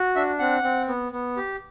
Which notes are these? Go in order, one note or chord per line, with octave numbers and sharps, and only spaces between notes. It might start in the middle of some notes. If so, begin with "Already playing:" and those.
Already playing: F#4
D4 E5
C4 F#5
C4
B3
B3
G4